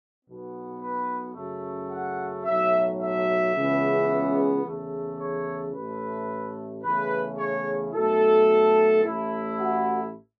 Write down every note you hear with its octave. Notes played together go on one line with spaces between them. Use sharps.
B1 B2 B3
B4
F#2 C#3 A3
F#5
B1 A2 F#3 E5
E5
C#2 C#3 E3 B3
E2 C#3 A3
C#5
A1 A2 A3 B4
E2 C#3 A3 E4 B4
C#5
B1 B2 A3 A4
A1 A2 A3 E4
F#4